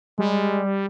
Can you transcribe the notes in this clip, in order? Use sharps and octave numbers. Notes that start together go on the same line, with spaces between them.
G3 G#3